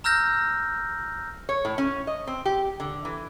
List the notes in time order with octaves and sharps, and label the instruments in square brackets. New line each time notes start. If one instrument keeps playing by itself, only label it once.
[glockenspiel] A#5 E6 F6 G6 A#6
[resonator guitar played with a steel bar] C#5
A2
C#4
D#5
C4
G4
D3
E3